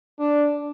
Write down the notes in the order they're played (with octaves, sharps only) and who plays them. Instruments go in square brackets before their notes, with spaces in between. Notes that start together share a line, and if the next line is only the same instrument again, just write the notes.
[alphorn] D4